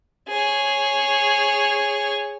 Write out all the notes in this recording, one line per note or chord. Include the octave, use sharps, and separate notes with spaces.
G#4 C#5